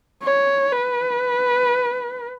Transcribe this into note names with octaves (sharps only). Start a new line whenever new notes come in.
C#5
B4